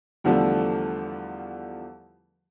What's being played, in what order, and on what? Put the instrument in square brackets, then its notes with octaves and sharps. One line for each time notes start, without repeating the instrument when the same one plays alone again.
[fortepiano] E2 D3 F3 G3 A3